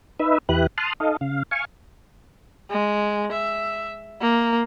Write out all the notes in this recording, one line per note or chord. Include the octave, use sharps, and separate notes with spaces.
D#4 B4 E5
E2 E4 G4 B4 F#6
A5 C6 D#6 F6 F#6
D#4 A4 D#5 F5
C#3 F5
F5 G#5 C#6
G#3
E5
A#3